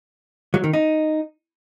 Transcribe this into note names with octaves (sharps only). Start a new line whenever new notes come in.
F#3
D#3
D#4